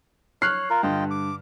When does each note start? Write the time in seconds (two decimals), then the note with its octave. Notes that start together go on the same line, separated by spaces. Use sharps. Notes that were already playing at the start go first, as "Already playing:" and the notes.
0.42 C#5 F6 F#6 C7
0.70 F4 A#4
0.83 G2 D3 F4 D#5 G5
1.11 D6